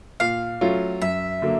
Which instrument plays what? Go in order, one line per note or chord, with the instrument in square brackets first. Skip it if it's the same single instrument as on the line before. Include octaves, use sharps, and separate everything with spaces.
[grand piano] A#2 [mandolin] F5
[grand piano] F#3 A3 C#4 F4
[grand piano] F#2 [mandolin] E5
[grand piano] D3 F#3 A#3